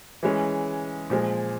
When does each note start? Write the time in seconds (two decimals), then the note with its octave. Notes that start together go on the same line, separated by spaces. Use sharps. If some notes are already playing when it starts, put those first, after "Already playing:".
0.23 E3 G#3 C#4
1.10 A#2 F3 G#3